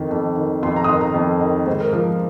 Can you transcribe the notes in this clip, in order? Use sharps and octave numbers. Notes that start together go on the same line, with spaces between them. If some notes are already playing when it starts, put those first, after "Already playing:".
Already playing: F2 D#3
F2
D#3
F2 C6
A#5
D#6
D#3 C6
A#5
F2
D#3
G#2 C5
A#4
F3 A#4